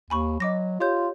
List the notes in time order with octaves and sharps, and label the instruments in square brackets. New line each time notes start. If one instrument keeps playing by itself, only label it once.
[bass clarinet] D#2 [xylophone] G#5 B5 C#6
[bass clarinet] F#3 [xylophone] D#5 D6 A#6
[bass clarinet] F4 [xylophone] G4 C#5 G6